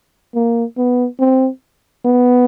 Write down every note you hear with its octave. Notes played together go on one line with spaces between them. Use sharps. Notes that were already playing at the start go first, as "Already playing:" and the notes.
A#3
B3
C4
B3